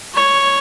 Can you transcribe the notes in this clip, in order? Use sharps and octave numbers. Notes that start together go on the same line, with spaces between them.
C#5